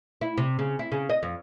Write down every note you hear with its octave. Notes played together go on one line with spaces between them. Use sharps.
E4
C3
C#3
E4
C#3
D#5
F2